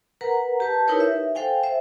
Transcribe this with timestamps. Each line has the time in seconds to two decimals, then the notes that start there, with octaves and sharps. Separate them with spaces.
0.21 A#4 B4 F#5 A#5
0.60 G4 B4 A5
0.88 D#4 E4 G4 A#4 B4 C#5
1.00 E5
1.35 A4 C5 F5 G5 G#5
1.63 C5 E5